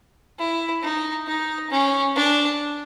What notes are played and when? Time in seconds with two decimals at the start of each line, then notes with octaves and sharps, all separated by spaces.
0.39 E4
0.82 D#4
1.27 D#4
1.70 C#4
2.16 D4